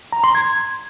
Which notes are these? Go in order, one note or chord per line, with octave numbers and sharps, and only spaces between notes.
A#5
C6
G#6